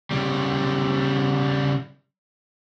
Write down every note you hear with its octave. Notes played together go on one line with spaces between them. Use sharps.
C#3 G3